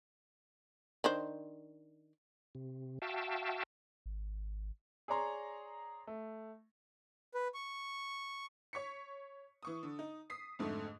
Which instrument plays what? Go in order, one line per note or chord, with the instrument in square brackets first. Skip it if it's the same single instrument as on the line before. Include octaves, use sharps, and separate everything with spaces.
[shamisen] D#3 D4 C5
[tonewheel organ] C3
F#4 E5 F5 G5 A5
[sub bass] G#1
[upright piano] G#4 C#5 D5 A#5 C6
A3
[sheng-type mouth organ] B4
C#6
[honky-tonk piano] C#5 C#6 B6 C#7
E3 C#6 D#6
D3
D#4
D#6 B6 C7
F2 G#2 D3 A3